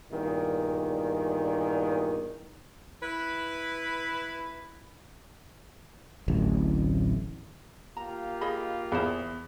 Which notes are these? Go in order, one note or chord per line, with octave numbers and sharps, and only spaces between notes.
E2 G2 A#2 D#3
E4 B4
D1 A1
A#3 F4 G4 A#5
G#4 D#5 B5
E2 G#4 C5